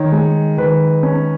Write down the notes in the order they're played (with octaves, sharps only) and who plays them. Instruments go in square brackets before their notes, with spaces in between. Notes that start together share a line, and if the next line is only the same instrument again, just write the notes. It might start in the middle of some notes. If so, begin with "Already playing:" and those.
Already playing: [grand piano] D#3 C#5
G#3
D#3 B4
C#4